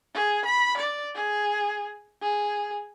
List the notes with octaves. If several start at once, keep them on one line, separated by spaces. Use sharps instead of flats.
G#4
B5
D5
G#4
G#4